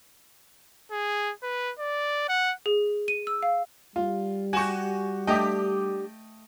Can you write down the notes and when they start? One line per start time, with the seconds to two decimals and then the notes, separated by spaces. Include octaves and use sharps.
0.92 G#4
1.43 B4
1.79 D5
2.29 F#5
2.66 G#4
3.08 D#7
3.27 E6
3.43 F5
3.96 G3 F4
4.53 F#4 G4 G#5 C#6
5.27 A3 D4 G4 D#5 G5